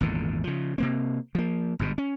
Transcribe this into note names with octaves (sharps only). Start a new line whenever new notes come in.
G#1 E2 A#2 D3
C#3 F3
C3 A#3 C4
F3 A#3
G1 G#2 B2
C#4